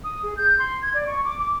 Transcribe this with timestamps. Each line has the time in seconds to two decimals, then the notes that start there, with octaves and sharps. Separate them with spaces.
0.04 D#6
0.23 G#4
0.37 G6
0.59 C6
0.82 G#6
0.94 D5
1.07 C#6
1.25 D6
1.39 D6